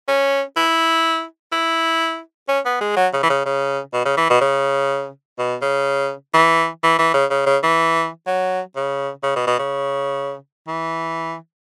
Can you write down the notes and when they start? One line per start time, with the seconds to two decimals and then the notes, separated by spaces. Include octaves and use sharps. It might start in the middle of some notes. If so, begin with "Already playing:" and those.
0.08 C#4
0.56 E4
1.52 E4
2.48 C#4
2.65 B3
2.81 G#3
2.96 F#3
3.13 C#3
3.23 E3
3.30 C#3
3.45 C#3
3.93 B2
4.05 C#3
4.17 E3
4.30 B2
4.41 C#3
5.38 B2
5.62 C#3
6.34 E3
6.83 E3
6.98 E3
7.14 C#3
7.30 C#3
7.46 C#3
7.63 E3
8.27 F#3
8.76 C#3
9.23 C#3
9.36 B2
9.47 B2
9.59 C#3
10.67 E3